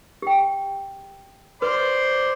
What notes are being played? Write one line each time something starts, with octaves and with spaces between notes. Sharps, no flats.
G4 G5
B4 C5 D5 C6